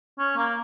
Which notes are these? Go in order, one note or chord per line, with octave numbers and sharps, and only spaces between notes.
C#4
A#3